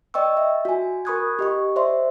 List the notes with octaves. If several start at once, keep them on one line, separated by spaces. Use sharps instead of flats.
D5 D#5 G5 C#6 E6
E5
F#4 G#5
A#4 B5 C#6 D#6 F#6 G#6
G4 D#5 C#6
C5 D5 E5 C6